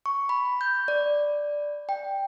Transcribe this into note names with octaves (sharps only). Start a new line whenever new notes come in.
C#6
B5
G6
D5
G5